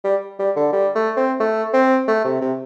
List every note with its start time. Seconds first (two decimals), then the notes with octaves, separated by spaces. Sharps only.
0.04 G3
0.39 G3
0.56 D3
0.73 G3
0.95 A3
1.17 C4
1.40 A3
1.73 C4
2.08 A3
2.25 C3
2.41 C3